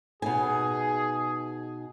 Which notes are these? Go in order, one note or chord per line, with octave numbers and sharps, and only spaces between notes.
B2 D#4 G#4 G#5